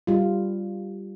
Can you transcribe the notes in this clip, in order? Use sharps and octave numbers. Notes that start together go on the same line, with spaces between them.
G3 F4